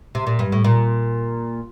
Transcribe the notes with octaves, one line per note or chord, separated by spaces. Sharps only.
C3
A#2
G2
A2
A#2